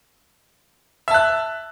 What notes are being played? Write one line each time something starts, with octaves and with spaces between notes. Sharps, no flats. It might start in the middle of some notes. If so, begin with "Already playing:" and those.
E5 A5 F#6